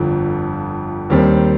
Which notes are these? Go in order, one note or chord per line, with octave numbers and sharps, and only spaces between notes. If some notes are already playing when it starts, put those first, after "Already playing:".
Already playing: G1 F2 D3 F3
D#2 D#3 G3 C4